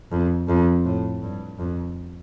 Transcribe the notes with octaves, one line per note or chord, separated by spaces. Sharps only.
F2
F2
A2
G2
F2